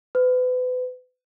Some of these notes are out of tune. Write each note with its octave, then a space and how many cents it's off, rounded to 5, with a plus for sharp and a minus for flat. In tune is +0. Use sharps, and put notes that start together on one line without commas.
B4 +35